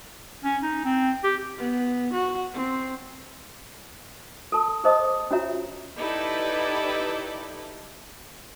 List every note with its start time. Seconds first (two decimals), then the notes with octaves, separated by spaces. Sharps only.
0.44 C#4
0.63 D#4
0.85 C4
1.24 G4
1.58 B3
2.13 F#4
2.53 C4
4.52 A4 A#4 A5
4.84 G#4 A#4 C5 D#5 A5 D#6
5.31 C#4 F4 F#4 C#5 E5 A#5
5.97 D#4 E4 G4 A4 B4 D5